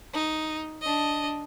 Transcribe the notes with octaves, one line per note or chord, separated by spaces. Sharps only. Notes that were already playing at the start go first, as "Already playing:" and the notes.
D#4
D4 D#5